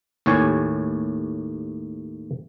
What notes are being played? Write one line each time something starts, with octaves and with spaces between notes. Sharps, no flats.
D#2 A2 G4 C#5 G#5